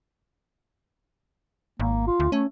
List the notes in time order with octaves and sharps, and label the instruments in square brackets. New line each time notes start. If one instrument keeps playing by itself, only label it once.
[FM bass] G#1 [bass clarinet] A#3
[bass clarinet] F4
[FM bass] D2
[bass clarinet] A3 [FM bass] C#4